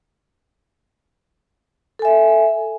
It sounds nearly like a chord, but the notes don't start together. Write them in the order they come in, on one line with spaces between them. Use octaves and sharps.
A4 G#5 E5